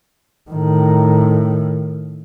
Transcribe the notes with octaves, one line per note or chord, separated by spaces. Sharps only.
A2 D#3